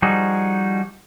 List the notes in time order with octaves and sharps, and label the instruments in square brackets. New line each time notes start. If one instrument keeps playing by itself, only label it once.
[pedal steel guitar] F3 G3 D#4 F#4 G#4